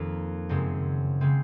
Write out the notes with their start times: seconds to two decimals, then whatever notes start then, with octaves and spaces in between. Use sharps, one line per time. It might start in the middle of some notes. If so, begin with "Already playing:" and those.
Already playing: F2 D#3 A#3
0.49 F#2 C#3 G#3 C4
1.21 C#3 G#3 C4